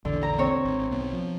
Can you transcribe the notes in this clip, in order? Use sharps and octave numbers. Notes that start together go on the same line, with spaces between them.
A#1 E2 D3
A#5
C4 C#5
G#1
B1 B3
F3